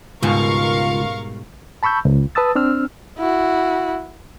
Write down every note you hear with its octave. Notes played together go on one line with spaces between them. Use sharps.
C#2 G#2 B2 G3 F4 A#4 F5 C#6
A5 B5 C#6 E6 G6
C#2
B4 A5 D#6 E6 A6
C4 D4 E6 F6
E4 F#4